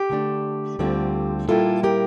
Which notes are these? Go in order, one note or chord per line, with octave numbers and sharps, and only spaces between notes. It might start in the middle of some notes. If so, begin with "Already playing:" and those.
Already playing: G4
D3 A3 D4
D2 D3 G3 C4 F4
A#2 G3 A#3 E4 F4 A4
G4 A#4